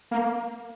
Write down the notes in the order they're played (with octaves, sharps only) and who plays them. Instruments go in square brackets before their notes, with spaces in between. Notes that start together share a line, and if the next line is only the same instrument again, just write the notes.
[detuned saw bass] A#3